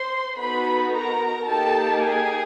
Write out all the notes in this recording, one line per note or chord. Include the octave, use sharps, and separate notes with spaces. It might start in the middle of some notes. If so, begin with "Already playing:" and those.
Already playing: C5 C6
B3 D#4 F#4 A4 B4 B5
A#4 A#5
A#3 D#4 G4 A4 A5
G#4 G#5